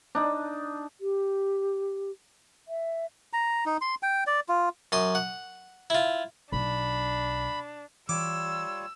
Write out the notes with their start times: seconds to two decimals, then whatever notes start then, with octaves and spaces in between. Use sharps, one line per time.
0.15 D4 D#4
1.01 G4
2.68 E5
3.33 A#5
3.66 D#4
3.81 C6
4.03 G5
4.27 D5
4.49 F4
4.92 F#2 C6 D#6
5.15 F#5
5.90 E4 F4
6.52 B1 D4 B5
8.09 E3 G3 F4 C#5 D6 E6